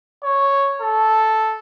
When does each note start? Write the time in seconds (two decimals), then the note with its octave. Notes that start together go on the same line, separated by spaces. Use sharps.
0.23 C#5
0.81 A4